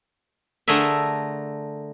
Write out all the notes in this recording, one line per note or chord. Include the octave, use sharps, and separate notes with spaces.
D3 A3 G#4 A#4 E5